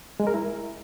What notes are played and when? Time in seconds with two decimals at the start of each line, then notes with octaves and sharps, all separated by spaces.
0.20 G#3
0.27 A#4
0.34 E4